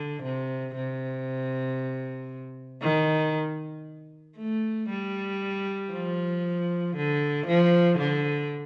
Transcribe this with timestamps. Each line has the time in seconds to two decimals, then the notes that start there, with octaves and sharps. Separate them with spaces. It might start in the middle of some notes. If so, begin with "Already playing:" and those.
Already playing: D3
0.23 C3
0.75 C3
2.82 D#3
4.37 A3
4.89 G3
5.92 F3
6.96 D3
7.47 F3
7.99 D3